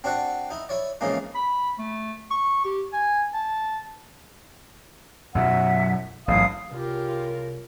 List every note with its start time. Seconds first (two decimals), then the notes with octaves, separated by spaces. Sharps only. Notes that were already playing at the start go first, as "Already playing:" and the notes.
0.04 C4 D4 F#4 D5 F#5
0.50 D#4 E4
0.69 E4 C#5 D5
1.01 F2 C#3 E3 G#3 A#3 D#4
1.35 B5
1.79 A3
2.31 C#6
2.65 G4
2.93 G#5
3.34 A5
5.35 F#2 B2 F#3 E5 F#5
6.28 A1 G#2 F#3 F5 D#6
6.71 C2 C#3 F4 G4 A#4